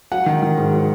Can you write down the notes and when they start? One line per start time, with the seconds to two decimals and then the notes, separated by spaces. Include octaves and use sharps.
0.12 F#3 F#5
0.26 D#3
0.43 D#3
0.57 G#2
0.74 F#3